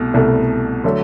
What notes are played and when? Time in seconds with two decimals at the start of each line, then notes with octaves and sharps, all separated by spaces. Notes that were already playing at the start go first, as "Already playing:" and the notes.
Already playing: C2 B2 A3
0.14 C2 B2 A3
0.84 D3 F#3 A3